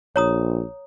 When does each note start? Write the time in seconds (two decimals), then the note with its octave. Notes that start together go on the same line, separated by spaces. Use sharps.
0.16 A#1 C#5 A#5 D#6